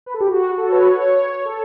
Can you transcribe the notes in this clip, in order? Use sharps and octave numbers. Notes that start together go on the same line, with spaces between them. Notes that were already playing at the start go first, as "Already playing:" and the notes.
B4
A4
G4
F#4
A4
C#5
B4
C#5
C#5
C#5
A4